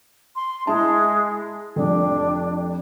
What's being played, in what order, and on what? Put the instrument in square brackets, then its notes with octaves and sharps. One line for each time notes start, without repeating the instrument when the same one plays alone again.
[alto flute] C6
[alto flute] G#3 [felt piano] E4 A5
[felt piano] F1 F2 [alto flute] D4